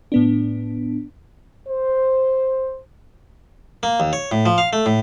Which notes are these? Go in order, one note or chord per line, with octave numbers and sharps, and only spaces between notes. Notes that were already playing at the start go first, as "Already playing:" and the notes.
A2 B3 D4
C5
A#3
D#2
C#5
A2
F3
F5
A3
A2